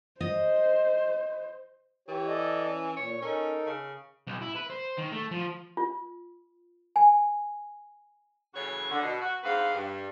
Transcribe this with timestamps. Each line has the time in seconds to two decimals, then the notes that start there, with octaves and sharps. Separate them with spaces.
0.21 C5 D#5
2.08 E3 G4 C#5
2.27 A4 D5 D#5
2.66 C#4
2.96 A#2 C#5
3.22 C#4 D#4 A4 A#4
3.66 C#3
4.27 B1
4.41 E4
4.55 B4
4.70 C5
4.98 D#3
5.12 A3
5.31 F3
5.77 F4
6.96 G#5
8.54 C#3 E3 F#3 A3 F#4 C#5
8.90 D3
9.02 B2
9.20 F#4
9.43 D2 G#2 B3 C4 B4 F5
9.73 G2